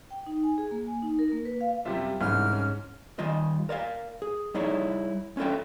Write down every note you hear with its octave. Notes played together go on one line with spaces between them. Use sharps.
G5
D#4
G#5
G#4
A#3
G#5
D#4
A#4
A#3
B4
F5
F#2 C3 G3 F4 G4 E5
C2 G#2 E3 C#4 F6
C#4
D#3 G3 F4 D#5
A#4 D5 D#5 F5
G#4
G3 D#4 E4 G#4 C#5
C#4 D4 F4 A4 E5 G5